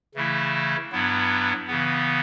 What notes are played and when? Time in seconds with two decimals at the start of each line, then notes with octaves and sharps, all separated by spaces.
0.15 C#3 E3 A3 E4
0.91 G2 F#3 B3 E4
1.67 C#3 E3 B3